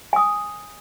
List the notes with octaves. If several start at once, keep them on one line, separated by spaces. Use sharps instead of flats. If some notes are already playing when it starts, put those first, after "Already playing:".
G#5 D#6